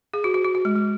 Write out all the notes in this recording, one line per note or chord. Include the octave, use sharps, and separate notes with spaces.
G#4
F#4
F#4
F#4
F#4
G#3
G#3